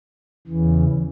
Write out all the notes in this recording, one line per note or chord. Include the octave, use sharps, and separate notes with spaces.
E2 C#3 E3